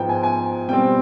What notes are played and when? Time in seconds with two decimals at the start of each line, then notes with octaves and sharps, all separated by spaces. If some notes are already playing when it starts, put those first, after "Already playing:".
Already playing: G#2 F3 B3 G5
0.09 G#5
0.23 G#5
0.68 B2 G3 C4 G5